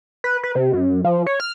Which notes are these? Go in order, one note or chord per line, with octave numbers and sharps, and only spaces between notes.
B4
B4
C3
F#2
F3
C#5
F6